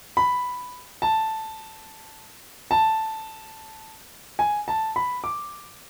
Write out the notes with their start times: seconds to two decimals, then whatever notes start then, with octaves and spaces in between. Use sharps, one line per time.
0.17 B5
1.02 A5
2.71 A5
4.39 G#5
4.68 A5
4.96 B5
5.24 D6